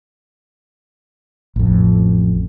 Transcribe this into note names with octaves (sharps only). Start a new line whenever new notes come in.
A1 F2